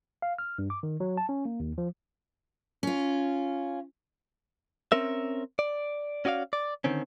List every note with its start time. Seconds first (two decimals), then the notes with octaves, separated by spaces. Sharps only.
0.22 F5
0.39 F6
0.59 G2
0.70 D6
0.83 D#3
1.00 F#3
1.18 A5
1.29 C#4
1.45 A#3
1.60 D#2
1.78 F3
2.83 C#4 F4
4.92 C4 C#4 A#4 E5
5.59 D5
6.25 C#4 F#4 D5 D#5 F5
6.53 D5
6.84 D3 D#3 C4 C#4